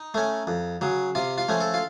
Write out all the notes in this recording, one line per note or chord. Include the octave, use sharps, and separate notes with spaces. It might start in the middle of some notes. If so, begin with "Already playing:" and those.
Already playing: D#4
A3 C#4
F2
C#3 F#3
C3 F4
F4
F3 A3 C#4
A4
F4